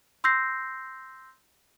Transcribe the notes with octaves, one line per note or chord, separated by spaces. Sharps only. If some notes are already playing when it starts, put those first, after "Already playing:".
C6 E6 G6 A#6 C7